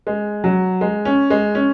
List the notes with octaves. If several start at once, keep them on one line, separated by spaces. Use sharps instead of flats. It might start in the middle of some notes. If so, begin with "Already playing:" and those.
G#3
F#3
G#3
C#4
G#3
C#4